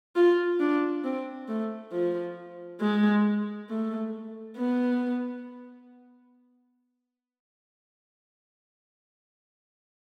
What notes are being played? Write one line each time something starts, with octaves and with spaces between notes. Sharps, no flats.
F4
D4
C4
A3
F3
G#3
A3
B3